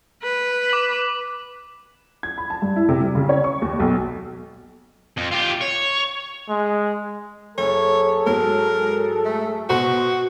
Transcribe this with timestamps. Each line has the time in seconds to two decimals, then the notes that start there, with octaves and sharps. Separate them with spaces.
0.23 B4
0.69 D6 F#7
2.23 G#6
2.38 B5
2.50 A5
2.62 G2
2.76 E4
2.89 C3
3.00 G3
3.15 C#3
3.29 C#5
3.44 C#6
3.62 D#2
3.80 B1
5.18 F2
5.32 F4 G4
5.62 C#5
6.49 G#3
7.58 F#1 G#4 A4 C#5
8.26 G#2 F#3 A#4
9.25 A3
9.69 B2 F#4 C5